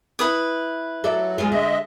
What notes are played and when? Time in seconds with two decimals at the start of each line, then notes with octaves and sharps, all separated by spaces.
0.19 E4 B4 D#6
1.04 F#3 A4 D5 E5
1.38 G#3 B3 F4
1.52 D3 G#3 D#5 E5